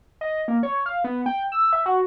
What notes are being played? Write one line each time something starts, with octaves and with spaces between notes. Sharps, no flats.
D#5
A#3
C#5
F5
B3
G5
E6
E5
F#4